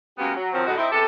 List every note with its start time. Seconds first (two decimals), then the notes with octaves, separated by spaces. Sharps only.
0.18 F#3 G#3 A#3 B3 C#4 G4
0.36 F#3
0.52 D#3 F3 F#3 C4
0.66 A2 D3 G#3 D#4 F#4
0.77 C4 D#4 E4
0.91 E2 C3 G4 A4